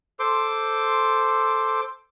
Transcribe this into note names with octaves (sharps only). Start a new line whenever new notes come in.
A4 C5 C6 D6